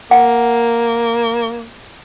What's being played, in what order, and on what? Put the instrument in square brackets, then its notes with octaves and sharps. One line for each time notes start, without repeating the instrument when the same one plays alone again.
[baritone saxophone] A#3 [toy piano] F#5